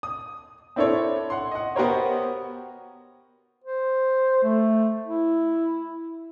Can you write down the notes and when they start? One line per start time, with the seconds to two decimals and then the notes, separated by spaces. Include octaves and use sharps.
0.03 D#6
0.76 C4 D4 E4 A4 C5 C#5
1.30 F#5 C6
1.51 D#5 F#5
1.76 B3 F#4 G4 A#4 C5 C#5
3.64 C5
4.43 A3
5.06 E4